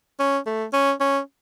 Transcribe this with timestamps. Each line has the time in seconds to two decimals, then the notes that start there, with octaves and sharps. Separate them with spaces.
0.20 C#4
0.46 A3
0.73 C#4
1.00 C#4